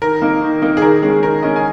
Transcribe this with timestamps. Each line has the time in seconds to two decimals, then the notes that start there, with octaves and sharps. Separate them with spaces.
0.02 D#3 A#4
0.22 A#3 D#4
0.41 D#3
0.62 A#3 D#4
0.77 G#4
0.82 D#3 A#4
1.02 G#3 C#4 G#4
1.23 D#3 A#4
1.43 G#3 C#4 D#5
1.56 G#5